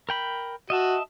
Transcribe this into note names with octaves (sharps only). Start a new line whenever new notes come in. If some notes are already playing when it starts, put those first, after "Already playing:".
A#4 G5 B5
F#4 D#5 E5 A5